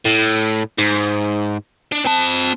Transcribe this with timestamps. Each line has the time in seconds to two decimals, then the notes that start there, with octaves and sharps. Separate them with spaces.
0.05 A2
0.78 G#2
1.92 D4
2.06 C4 A5